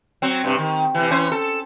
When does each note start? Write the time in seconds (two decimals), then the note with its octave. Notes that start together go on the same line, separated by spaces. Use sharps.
0.22 F#3 C4
0.44 G2 C3
0.58 D#3
0.95 C3 E3
1.10 E3 C#4 C5
1.32 A4